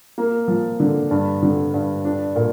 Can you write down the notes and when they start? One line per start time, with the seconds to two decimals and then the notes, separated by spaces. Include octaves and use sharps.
0.18 A#3
0.48 F3
0.80 D3
1.11 G2
1.42 D3
1.74 G2
2.05 D4
2.36 A#2